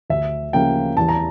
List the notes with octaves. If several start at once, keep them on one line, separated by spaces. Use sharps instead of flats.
D2 E5
C#3 F3 A#3 G5
E2 A5
A#5